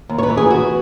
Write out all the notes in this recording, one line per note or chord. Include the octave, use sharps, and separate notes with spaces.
D#2
C#5
B4
E3
G#4
B3 F#4